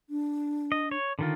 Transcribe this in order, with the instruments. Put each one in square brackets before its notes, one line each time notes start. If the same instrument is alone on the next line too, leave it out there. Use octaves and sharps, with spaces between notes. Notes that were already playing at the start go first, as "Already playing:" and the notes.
[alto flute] D4
[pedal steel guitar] D#5
C#5
D3 D#3 F4